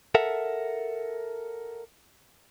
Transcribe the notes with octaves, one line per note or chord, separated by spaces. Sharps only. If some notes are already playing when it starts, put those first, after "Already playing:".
A4 A#4 E5 F#5